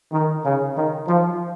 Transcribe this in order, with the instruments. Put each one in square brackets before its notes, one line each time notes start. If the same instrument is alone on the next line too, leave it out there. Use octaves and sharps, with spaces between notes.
[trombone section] D#3
C#3
D#3
F3